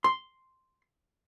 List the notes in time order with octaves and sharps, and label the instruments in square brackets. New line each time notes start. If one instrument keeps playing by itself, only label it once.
[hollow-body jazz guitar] C6